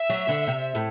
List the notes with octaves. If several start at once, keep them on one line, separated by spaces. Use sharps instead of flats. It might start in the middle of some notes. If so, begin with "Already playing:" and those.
Already playing: E5
F#3
D3
C3
A2